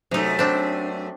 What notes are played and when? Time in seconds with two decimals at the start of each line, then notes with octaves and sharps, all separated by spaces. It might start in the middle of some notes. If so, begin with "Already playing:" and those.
0.11 F#2 C3 A3 D#4
0.39 C4 D4